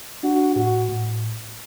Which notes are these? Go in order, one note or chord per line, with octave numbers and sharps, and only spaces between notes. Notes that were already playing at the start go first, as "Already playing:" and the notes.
D4 F#4
A2 F#4
A2